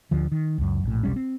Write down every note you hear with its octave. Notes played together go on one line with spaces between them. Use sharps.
D2 D3 F3
D#3
C#2 F#2
A#1 A2
F1 B1 G3 C#4
C4